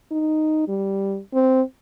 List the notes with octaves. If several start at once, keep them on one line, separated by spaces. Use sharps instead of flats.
D#4
G3
C4